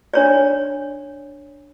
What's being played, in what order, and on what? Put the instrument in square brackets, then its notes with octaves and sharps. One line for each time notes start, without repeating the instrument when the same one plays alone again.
[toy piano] D4 C#5 D5